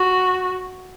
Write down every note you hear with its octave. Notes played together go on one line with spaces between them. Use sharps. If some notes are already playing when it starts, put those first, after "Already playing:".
Already playing: F#4